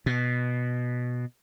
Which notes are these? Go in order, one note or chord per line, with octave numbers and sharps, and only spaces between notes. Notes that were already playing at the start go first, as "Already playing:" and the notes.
B2